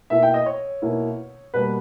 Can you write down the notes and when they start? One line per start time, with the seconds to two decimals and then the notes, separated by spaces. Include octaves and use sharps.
0.10 B2 A#3 E4 E5
0.22 G5
0.34 D#5
0.46 C#5
0.82 B2 A#3 E4
1.54 B2 G3 A#3 B4